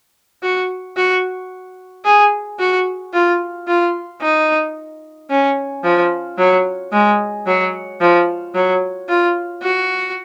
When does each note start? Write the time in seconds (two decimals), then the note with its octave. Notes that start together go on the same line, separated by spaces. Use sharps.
0.42 F#4
0.96 F#4
2.05 G#4
2.59 F#4
3.13 F4
3.67 F4
4.21 D#4
5.30 C#4
5.84 F3
6.38 F#3
6.92 G#3
7.46 F#3
8.00 F3
8.54 F#3
9.09 F4
9.62 F#4